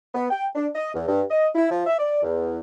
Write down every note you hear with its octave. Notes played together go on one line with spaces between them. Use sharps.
B3
G5
D4
D#5
E2
G2
D#5
E4
F3
E5
D5
E2